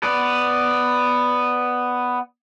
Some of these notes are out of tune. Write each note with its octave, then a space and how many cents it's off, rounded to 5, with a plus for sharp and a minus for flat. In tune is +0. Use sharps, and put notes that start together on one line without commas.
B3 +5 D5 +0